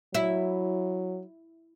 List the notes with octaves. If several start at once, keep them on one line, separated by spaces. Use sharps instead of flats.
F#3 E4